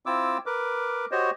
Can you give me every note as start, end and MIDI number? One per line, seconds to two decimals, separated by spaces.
0.06 0.38 60
0.06 0.38 64
0.06 0.38 65
0.06 0.38 86
0.06 0.38 88
0.46 1.06 70
0.46 1.06 71
0.46 1.06 86
1.11 1.30 66
1.11 1.30 67
1.11 1.30 72
1.11 1.30 73
1.11 1.30 75